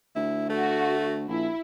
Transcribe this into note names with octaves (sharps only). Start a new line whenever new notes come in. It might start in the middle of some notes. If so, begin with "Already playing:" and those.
D2 E4
A3 F#4
A#1 E4